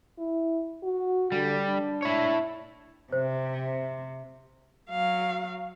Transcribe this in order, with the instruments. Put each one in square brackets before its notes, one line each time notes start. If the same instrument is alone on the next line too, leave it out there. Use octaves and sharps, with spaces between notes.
[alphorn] E4
F#4
[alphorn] D3 [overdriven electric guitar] G3
[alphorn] D4
[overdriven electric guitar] E4 C#5
[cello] C3 [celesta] C5
[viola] F#3 F5